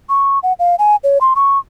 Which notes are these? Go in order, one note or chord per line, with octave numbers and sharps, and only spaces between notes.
C#6
F#5
F5
G#5
C#5
C6
C#6